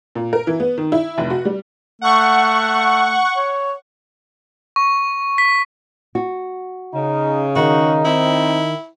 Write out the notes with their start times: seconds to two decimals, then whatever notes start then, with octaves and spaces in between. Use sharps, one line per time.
0.15 A#2
0.33 A#4
0.47 E3
0.60 B3
0.78 D#3
0.92 E4
1.18 F1
1.30 F#4
1.45 G3
2.01 A3 F#5 C#6
3.37 C#5
4.76 C#6
5.38 B6
6.15 F#4
6.94 C#3 D#4
7.56 D#3 D#4 F#4
8.05 C4 E4